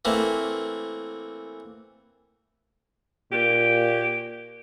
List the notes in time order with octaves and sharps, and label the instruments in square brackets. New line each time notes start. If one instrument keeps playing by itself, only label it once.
[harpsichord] E3 A3 A#3 C4
[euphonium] A#2 [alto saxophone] G4